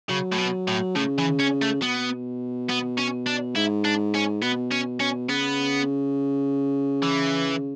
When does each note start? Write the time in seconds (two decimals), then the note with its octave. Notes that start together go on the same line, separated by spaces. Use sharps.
0.09 C#3 F#3
0.33 A2
0.38 B2
0.68 A2
0.96 A2 C#3
1.18 E3
1.39 C#4
1.62 A3
1.82 B2 B3
2.69 B3
2.98 C#4
3.27 D4
3.56 G#2 E4
3.85 D4
4.15 C#4
4.42 B2 B3
4.71 C#4
5.00 C#4
5.29 C#3 B3
7.03 E3